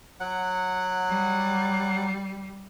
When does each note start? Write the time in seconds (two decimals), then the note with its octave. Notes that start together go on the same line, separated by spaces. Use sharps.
0.20 F#3 F#5
1.10 G3